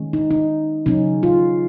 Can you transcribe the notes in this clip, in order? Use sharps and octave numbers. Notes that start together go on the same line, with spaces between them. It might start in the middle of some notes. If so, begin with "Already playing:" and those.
Already playing: D#3 G#3 C#4
D#4
D#4
C#3 F#3 C#4 D#4
F4